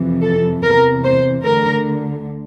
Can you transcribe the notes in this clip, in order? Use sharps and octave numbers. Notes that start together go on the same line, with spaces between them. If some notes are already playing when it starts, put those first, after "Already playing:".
Already playing: F2 C3 E3
A4
E2 C3 E3 A#4
C5
D2 D3 A#4